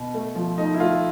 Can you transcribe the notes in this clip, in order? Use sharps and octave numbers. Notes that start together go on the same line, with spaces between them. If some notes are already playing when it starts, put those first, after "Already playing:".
Already playing: B2
A3
F3
A3 D#4
E4
A3 F4